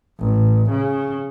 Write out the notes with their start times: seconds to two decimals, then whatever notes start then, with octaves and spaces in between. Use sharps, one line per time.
0.19 A1
0.71 C#3